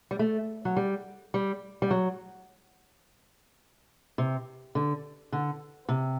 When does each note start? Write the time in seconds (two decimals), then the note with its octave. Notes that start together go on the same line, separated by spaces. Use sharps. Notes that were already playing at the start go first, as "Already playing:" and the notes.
0.11 G3
0.19 A3
0.65 F#3
0.77 G3
1.34 G3
1.82 G3
1.91 F#3
4.18 C3
4.75 D3
5.32 D3
5.89 C3